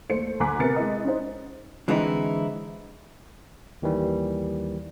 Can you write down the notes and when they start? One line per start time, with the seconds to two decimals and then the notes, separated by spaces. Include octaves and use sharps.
0.09 D#2 A3 C5 C#7
0.40 D2 G#5 A#5 D6 F#6 B6
0.59 C3 B3 A#4 A6 C#7
0.76 G#3 E4 D#5
1.05 C#4 D#4 C5
1.88 D3 E3 G#3 C4 D#4 E4
3.82 D#2 D#3 E3 G3